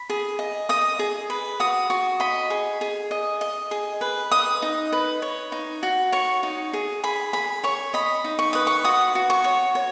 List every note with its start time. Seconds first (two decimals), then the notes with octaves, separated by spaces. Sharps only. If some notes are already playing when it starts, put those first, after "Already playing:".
Already playing: B5
0.10 G#4
0.39 D#5
0.69 D#5 D#6
0.99 G#4
1.30 B4
1.60 F#4 D#6
1.90 F#4 C#6
2.20 D#5 B5
2.50 G#4
2.81 G#4
3.11 D#5
3.41 D#5
3.71 G#4
4.01 B4
4.31 D#5 D#6
4.62 D#4
4.92 B4
5.22 C#5
5.52 D#4
5.83 F#4
6.12 C#5 C#6
6.43 D#4
6.73 G#4
7.04 G#4 B5
7.33 G#4 B5
7.64 C#5 C#6
7.94 D#5 B5
8.24 D#4
8.39 C#6
8.53 B4 D#6
8.67 C#6
8.84 F#4 D#6
9.15 F#4
9.30 C#6
9.44 C#5
9.75 C#5